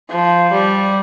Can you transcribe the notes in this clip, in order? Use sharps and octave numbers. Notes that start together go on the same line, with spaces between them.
F3
G3